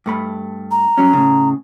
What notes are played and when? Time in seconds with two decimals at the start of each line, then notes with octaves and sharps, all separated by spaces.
0.06 G2 A3 B5
0.71 A#5
0.98 G2 F#3 C#4
1.13 A2 C#3